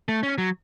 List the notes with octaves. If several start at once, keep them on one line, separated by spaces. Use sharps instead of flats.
A3
C#4
F#3